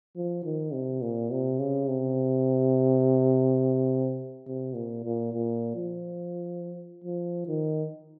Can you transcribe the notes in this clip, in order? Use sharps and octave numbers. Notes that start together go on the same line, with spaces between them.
F3
D#3
C3
A#2
C3
C#3
C3
C3
A#2
A#2
A#2
F3
F3
D#3